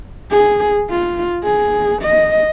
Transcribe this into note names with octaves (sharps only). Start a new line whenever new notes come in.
G#4
F4
G#4
D#5